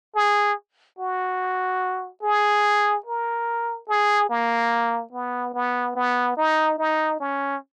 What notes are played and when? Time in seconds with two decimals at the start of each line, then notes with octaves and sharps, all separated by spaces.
0.16 G#4
0.98 F#4
2.23 G#4
3.06 A#4
3.89 G#4
4.30 A#3
5.13 B3
5.54 B3
5.96 B3
6.37 D#4
6.78 D#4
7.20 C#4